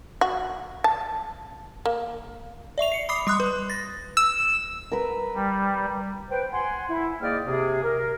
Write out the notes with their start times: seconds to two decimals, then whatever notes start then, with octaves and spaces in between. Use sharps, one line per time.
0.21 F#4
0.84 A5
1.85 A#3
2.78 D5 E5 C#6 F7
2.92 C7 C#7
3.09 B5 D6 D#6 C7
3.27 G3 C6 D#6 F#6
3.40 B4
3.70 A6 A#6
4.17 E6
4.92 A#4 B4
5.35 G3
6.30 B4 C5 G5
6.52 F#5 G#5 C6
6.89 E4
7.21 G#2 A#3 D5 D#5 G5 F6
7.46 C3 G#4
7.83 A#4